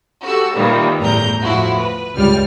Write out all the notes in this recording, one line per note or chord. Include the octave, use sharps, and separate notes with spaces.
F#4 G4 A4 E6
A#2 D#3 E3 G3 A#3
G1 E2 A2 A#5 G6
A2 F3 E4 F#4
B4
C#2 G2 G3 F6